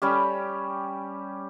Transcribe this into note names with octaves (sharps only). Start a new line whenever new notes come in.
G3 C#4 G4